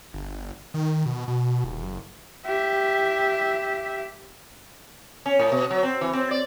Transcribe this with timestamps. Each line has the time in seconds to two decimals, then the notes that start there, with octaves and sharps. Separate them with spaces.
0.14 G1
0.74 D#3
1.06 B2
1.28 B2
1.64 D#1
1.82 F#1
2.46 G4 E5
5.26 C#4
5.39 A2
5.52 B2
5.70 F#3
5.83 C4
6.01 E3
6.13 C4
6.31 D5